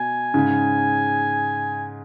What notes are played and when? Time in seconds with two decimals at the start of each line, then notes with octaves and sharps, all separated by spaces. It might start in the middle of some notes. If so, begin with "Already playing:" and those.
Already playing: B2 G#5
0.34 G#2 C#3